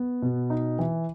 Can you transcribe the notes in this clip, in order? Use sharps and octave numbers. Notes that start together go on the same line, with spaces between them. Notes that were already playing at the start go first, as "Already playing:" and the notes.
Already playing: B3
B2
D#4
E3